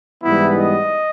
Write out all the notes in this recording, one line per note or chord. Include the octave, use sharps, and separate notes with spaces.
G#2 E3 G3 B3 E4
D#5